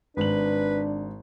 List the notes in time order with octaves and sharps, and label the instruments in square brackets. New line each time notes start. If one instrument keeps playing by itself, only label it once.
[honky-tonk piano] G#1 F#7 [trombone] D4 [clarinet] B4